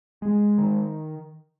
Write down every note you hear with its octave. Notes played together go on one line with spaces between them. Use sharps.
G#3
D#3